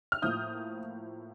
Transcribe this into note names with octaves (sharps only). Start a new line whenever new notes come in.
F6
A2 F3 A#3 D#6 G6